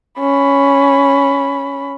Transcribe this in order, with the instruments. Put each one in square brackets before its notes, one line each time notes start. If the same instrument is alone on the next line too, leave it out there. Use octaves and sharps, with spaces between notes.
[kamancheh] C#4 B5